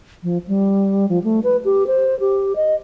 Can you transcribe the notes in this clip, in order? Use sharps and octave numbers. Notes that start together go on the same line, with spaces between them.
F3
G3
F3
A3
B4
G4
C5
G4
D#5